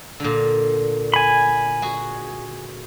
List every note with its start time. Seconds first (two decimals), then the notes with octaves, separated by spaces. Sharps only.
0.20 A#2 D3
1.14 G#5 B5
1.82 F#4 G#4